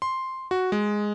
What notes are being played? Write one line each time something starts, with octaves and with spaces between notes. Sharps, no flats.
C6
F#4
G#3